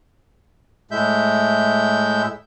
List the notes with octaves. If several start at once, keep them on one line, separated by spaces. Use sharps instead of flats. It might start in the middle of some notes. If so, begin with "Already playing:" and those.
A2 G#3 E5 G6